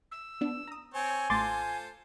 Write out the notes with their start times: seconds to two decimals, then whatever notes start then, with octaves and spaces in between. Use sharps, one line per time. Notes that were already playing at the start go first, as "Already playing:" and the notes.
0.11 E6
0.41 B3 D4
0.68 A#5 D#6
0.94 C4 C#5 G#5
1.30 A1 A3 F4 A4 C5 C6 D6 A6